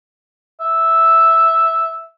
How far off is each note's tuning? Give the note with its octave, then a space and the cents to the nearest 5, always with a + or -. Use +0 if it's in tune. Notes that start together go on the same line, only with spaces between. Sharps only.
E5 -5